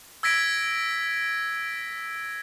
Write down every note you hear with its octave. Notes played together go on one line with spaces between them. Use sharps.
E6 G#6 A#6 B6 D7